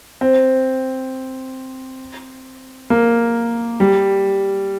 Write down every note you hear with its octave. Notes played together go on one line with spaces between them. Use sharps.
C4
A#3
G3